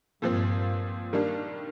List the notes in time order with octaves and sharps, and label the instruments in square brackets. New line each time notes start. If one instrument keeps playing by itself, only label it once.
[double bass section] G2 [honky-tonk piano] A#2 F3 C4
[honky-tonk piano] D#3 G3 A#3 D4